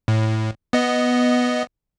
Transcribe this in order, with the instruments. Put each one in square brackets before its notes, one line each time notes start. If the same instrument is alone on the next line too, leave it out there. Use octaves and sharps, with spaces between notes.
[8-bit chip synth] A2
B3 D#5